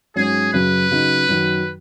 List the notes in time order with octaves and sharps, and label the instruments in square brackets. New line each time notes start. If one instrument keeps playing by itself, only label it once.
[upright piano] G#2 F#3 C#4 [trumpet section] G#4
[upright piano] F#2 C#3 F#3 [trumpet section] B4
[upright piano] C#3 F#3 D#4
F#2 D#3 F#3